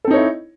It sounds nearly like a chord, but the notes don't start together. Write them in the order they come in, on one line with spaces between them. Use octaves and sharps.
A4 C4 D#4 C#5 E4